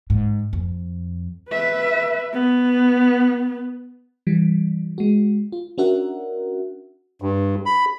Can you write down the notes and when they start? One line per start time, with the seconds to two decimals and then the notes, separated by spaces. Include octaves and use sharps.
0.10 G#2
0.53 F2
1.51 B4 E5
2.33 B3
4.27 E3 G3
4.98 G#3 F#4
5.52 F4
5.78 C#4 D4 F#4 A#4 E5 F#5
7.22 G2
7.66 B5